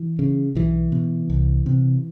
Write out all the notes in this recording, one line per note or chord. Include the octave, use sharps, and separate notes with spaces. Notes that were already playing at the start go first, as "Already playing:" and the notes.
Already playing: E3
C#3
B1 E3
B2
C2
C3